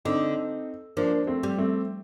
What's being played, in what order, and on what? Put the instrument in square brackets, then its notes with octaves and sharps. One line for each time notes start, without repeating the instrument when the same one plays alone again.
[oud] D3 [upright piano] C4 D#4
[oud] F3 [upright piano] A#3 D4
[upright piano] A3 C4
[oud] G3
[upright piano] A3 C4